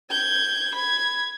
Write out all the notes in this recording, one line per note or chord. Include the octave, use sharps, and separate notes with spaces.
G6 G#6
B5 G#6